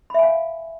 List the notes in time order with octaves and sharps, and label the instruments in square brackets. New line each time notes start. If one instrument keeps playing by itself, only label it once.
[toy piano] B5
E5
G#5
F5